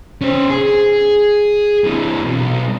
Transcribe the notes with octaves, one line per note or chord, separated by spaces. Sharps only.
C#4 C5
G#4
C3 E3
B1